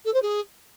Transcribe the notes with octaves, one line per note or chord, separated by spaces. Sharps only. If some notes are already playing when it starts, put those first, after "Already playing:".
A4
C5
G#4